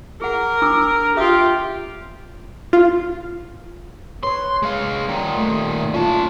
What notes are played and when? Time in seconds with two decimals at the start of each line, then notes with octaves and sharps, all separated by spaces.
0.22 G#4 A#4 F#5
0.62 D4 D6 E6
1.17 F4 G4 E5 D#6
2.73 F4
4.23 B4 C#5 C6
4.63 G#3 F5
5.09 A#2 D#3
5.37 A3
5.94 C#4 F4 A5